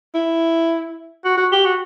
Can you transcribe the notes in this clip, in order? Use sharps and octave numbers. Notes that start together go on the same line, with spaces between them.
E4
F#4
F#4
G4
F#4